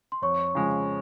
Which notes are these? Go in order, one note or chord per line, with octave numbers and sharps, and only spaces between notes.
C6
F2 C#5 C#6
C#3 F3 G#3 C#4